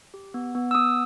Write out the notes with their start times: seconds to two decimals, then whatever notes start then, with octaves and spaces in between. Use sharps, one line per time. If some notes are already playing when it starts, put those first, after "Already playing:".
0.14 G4
0.34 B3
0.55 B3
0.71 E6
0.75 B3 D#6